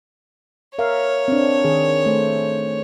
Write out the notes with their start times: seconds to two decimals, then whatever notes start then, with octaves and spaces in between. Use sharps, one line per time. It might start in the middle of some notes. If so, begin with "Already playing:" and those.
0.79 A#4 C#5 E5 F5
1.28 C4 D4
1.64 D#3 G#4
2.06 A3 C5